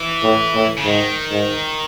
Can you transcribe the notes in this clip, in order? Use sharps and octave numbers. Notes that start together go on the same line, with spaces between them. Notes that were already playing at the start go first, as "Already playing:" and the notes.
Already playing: E3
A2
A2
C#3
G#2 D#3
G#2